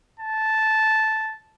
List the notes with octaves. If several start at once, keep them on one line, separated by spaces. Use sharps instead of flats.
A5